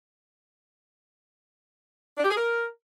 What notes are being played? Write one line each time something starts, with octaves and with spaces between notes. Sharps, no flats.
D4
G4
G#4
A#4